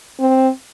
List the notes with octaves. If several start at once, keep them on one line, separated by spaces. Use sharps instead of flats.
C4